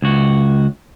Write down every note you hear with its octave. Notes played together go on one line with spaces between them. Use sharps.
C#2 F#4